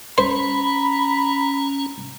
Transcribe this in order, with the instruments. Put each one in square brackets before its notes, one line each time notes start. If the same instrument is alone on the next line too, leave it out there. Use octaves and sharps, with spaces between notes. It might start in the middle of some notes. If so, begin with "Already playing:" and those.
[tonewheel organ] C#4 [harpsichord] C5 [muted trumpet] A#5 [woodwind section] B5